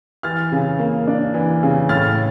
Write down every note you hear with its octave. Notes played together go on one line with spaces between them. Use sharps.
E3 F6 A6
C#3
A#3
D4
E3
C#3
A2 F6 A6